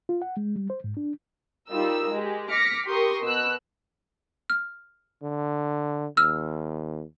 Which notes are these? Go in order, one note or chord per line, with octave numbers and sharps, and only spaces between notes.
F4
F#5
G#3
G3
C5
G#2
D4
G3 D#4 F4 A#4 E6
G#3 G4
D6 F6 A#6 B6 C#7
G4 A#4 C6 C#6 D#6
B2 E6 F#6
F6
D3
D#2 E6 F6